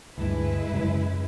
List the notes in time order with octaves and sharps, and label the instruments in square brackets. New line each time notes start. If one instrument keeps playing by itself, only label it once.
[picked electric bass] D2 G2 [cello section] G#3 E4 B4
[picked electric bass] F#2 C#3 F#3